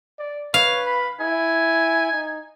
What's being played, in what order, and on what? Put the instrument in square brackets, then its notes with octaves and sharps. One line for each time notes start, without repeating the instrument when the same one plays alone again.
[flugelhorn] D5
[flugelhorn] B4 [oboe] C#5 [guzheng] F5
[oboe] B5
[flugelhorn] E4 [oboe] G#5
[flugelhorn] D#4